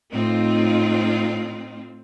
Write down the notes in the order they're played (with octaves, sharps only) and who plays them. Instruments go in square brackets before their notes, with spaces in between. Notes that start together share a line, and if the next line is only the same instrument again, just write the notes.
[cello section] A2 C4 D#4 F4